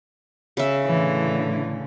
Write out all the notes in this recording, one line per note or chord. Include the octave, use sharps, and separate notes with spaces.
C#3 E5
A2 D3 E3